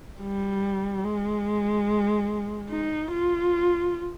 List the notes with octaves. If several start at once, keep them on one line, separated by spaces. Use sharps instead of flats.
G3
G#3
D#4
F4